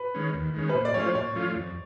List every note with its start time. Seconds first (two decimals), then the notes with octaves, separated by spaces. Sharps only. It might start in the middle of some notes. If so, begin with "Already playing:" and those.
Already playing: B4
0.15 D#3 G#3 C#4
0.34 D#2
0.54 D#3 G#3 C#4
0.69 B4
0.75 A#2 C5
0.85 D5
0.94 F3 A3 C#4 F4 C#5
1.05 C5
1.15 A#2 C#5
1.35 F3 A3 C#4 F4
1.56 F2